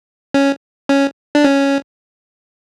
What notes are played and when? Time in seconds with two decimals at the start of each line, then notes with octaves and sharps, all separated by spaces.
0.34 C#4
0.89 C#4
1.35 D4
1.44 C#4